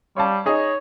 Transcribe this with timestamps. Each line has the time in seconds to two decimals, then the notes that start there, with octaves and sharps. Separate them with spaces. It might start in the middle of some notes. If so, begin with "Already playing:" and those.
0.17 G3 C#5 F5 A5
0.46 D#4 G#4 C#5 D#5